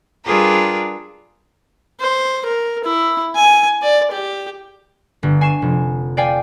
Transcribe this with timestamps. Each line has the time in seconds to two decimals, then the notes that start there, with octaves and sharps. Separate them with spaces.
0.25 G3 D4 F4 G#4 A#4 B4
2.00 C5
2.46 A#4
2.84 E4
3.35 G#5
3.82 D5
4.11 G4
5.23 G1
5.41 G#5 C#6 C7 D#7 E7
5.62 F1
6.17 D5 F5 G5 G#5